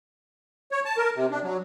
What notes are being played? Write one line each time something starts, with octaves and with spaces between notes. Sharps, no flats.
C#5
A5
A#4
C3
D4
F#3